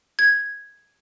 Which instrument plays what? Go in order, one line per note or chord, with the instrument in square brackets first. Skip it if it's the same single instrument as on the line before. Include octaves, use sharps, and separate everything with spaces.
[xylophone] G#6